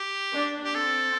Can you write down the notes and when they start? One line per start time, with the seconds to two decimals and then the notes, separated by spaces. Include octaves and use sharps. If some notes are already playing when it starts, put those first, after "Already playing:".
Already playing: G4
0.33 D4
0.64 G4
0.75 C4 A4